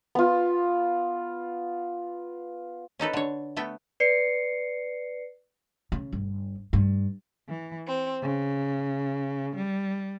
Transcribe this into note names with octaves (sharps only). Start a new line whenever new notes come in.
B3 F4
C#4 D#4 A4 B4
D3 C#5
A3 B3 E5 G5
B4 D5 C7 C#7
C#3
G1
G2
E3
C4
C#3
G3